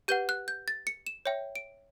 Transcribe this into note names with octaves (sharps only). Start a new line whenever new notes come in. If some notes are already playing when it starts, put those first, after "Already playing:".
G4 B4 F#5 G6
F#6
G6
A6
C#7
E7
C#5 E5 G5
D7